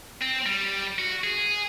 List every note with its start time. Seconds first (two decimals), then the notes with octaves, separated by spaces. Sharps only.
0.21 C4
0.46 G3
0.99 F#4
1.24 G#4